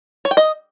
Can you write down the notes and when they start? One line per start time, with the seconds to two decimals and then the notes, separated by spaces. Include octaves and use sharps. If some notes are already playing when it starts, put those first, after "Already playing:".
0.25 C#5
0.31 G5
0.37 D#5